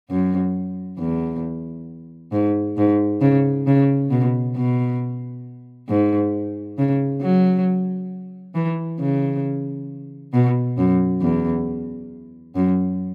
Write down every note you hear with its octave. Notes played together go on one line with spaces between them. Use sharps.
F#2
E2
G#2
G#2
C#3
C#3
B2
B2
G#2
C#3
F#3
E3
C#3
B2
F#2
E2
F#2